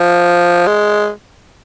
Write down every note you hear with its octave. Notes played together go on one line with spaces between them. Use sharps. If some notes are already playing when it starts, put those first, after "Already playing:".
Already playing: F3
G#3